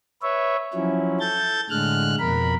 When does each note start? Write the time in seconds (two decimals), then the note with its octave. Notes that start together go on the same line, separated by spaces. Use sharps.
0.22 B4 C#5 E5
0.74 F3 F#3 C#4 E4
1.20 A4 G6 A6
1.70 A2 D3 G#3 F6 F#6
2.20 F2 B2 A#4 B5